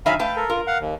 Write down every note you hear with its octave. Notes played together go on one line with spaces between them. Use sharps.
D#3 F#3 E5 F5 G#5 B5
A3 B4 F5 G5
A4 A#4
F4 A#4
F5 F#5
D#2